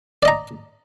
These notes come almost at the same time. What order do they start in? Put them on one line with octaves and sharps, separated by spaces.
D5 D#5 A#5